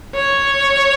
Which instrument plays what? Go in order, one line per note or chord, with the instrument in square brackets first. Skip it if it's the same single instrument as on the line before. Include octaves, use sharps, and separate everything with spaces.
[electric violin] C#5